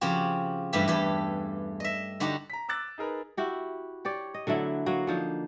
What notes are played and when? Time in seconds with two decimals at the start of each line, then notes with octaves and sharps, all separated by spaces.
0.01 C#3 F3 C4 F#4 G4
0.73 G2 E3 A3 G4 E5
0.88 E2 G2 E3 G4 A4
1.80 D#5 E5
2.20 D3 D#4 F#4 G4 A#5
2.50 A#5 B6
2.69 D6 E6 F#6 A6
2.98 D#4 G#4 A#4 B4
3.37 E4 F#4 G4
4.05 G4 C#5 D5
4.34 D#5
4.47 D3 F#3 A3 E4
4.86 F#3 A#3 F#4
5.07 D3 F3 D#4